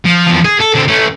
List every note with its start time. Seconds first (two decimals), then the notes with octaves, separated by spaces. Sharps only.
0.05 F3
0.28 E2 F3
0.45 G#4
0.60 A4
0.75 D3 C4
0.88 A3 C#4